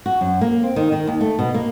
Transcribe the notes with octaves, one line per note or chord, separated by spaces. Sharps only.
F#4
F#2
A#3
C4
D#3
D#3
D#2
A3
B2
A#3